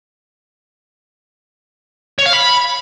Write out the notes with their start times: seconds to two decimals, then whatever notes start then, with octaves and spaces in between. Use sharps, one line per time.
2.18 C#5
2.26 F5
2.33 B5